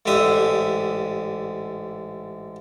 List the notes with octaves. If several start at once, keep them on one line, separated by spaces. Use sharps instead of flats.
A1 G#2 D3 G4 E5 D#6